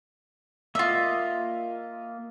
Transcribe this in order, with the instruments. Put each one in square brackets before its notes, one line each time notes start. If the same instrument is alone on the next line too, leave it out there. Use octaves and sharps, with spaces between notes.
[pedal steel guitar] A#3 D#5 [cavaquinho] F4 E5